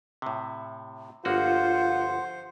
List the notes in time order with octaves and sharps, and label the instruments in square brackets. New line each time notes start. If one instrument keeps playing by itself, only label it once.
[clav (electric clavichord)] A2 C3
[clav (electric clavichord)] G1 A#3 F#4 [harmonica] F3 C5 [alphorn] F4 [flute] F#5